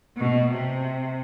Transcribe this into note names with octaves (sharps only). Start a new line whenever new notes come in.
B2
C3